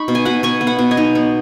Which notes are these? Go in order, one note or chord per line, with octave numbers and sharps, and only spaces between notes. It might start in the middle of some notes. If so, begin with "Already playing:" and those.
Already playing: D#4 B5 C#6
B2
G#5
B2 F#5 B5
B2 G#5 C#6
B3
F#5 B5
B2
D#5 G#5
D#4
B3